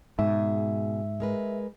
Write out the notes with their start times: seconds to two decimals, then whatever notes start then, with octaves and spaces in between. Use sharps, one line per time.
0.19 G#2 B2 G#4 E5
1.20 G#3 A#4 B4